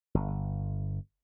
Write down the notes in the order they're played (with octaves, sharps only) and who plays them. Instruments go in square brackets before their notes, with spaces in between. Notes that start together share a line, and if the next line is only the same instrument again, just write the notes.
[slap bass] G1